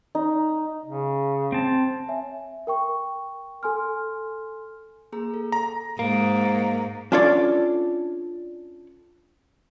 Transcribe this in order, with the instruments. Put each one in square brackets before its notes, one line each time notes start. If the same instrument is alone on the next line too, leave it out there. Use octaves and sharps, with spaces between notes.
[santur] D#4
[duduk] C#3
[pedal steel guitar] C4 A5
[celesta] C#5 E5 G#5
A#4 G5 C#6
A4 G#5 C6 F6
[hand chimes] A#3 G#4 A#5
A4
[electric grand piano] A#5
[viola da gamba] G#2 [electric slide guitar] A#3
[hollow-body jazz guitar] C#4 D4 F4 A4 C#5 D5